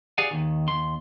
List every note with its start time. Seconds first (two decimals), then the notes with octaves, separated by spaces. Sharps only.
0.18 G4 G#4 D5 F5 F#5 G#5
0.31 D#2 D#3
0.68 D#2 C6